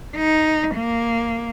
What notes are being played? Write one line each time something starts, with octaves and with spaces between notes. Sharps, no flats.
D#4
A#3